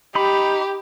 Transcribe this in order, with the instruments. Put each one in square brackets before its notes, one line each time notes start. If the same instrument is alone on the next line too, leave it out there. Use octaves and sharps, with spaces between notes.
[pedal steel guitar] D#4 B5 [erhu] G4